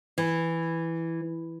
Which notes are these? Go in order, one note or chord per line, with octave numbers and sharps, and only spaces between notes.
E3